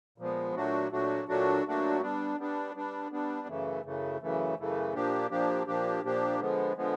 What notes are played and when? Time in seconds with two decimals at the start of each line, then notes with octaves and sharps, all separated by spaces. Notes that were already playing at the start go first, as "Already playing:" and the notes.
0.18 A#2 F3 G#3 B3
0.55 A#2 F#3 A3 D4 F#4
0.91 A#2 F#3 A3 D4 F#4
1.28 A#2 F#3 A3 D4 F#4
1.65 A#2 F#3 A3 D4 F#4
2.01 G3 B3 D4
2.38 G3 B3 D4
2.74 G3 B3 D4
3.11 G3 B3 D4
3.48 F#2 C#3 E3 A3
3.84 F#2 C#3 E3 A3
4.20 F#2 C#3 E3 A3
4.57 F#2 C#3 E3 A3
4.94 A#2 F3 A#3 D4 G4
5.30 A#2 F3 A#3 D4 G4
5.67 A#2 F3 A#3 D4 G4
6.04 A#2 F3 A#3 D4 G4
6.40 D3 F3 G#3 B3
6.76 D3 F3 G#3 B3